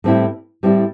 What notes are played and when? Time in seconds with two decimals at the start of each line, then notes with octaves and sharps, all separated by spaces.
0.04 A2 G3 C4 E4
0.63 A2 G3 C4 E4